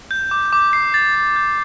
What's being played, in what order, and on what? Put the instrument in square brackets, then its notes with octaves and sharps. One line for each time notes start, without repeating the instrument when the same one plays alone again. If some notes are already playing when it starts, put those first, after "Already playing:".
[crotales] G6
D6
D6
C7
A6
A6
G6